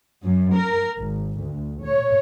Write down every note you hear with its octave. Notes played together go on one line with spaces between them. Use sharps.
F#2
A#4
G#1
D2
C#5